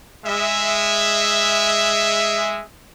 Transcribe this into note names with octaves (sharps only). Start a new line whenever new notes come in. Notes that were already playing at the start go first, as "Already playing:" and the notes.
G#3 E5